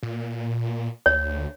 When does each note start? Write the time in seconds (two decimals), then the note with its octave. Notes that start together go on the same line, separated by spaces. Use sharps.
0.03 A#2
1.06 D2 C#5